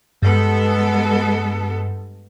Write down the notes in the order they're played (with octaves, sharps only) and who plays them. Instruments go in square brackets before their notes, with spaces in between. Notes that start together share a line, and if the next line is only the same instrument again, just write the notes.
[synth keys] G2 [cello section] G#3 B3 A4